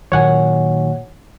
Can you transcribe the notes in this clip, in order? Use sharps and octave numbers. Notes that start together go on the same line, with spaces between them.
A#2 D#3 F#3 C#5 F#5 G#5